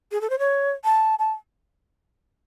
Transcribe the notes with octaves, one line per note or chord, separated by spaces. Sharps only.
G#4
A4
C5
C#5
A5
A5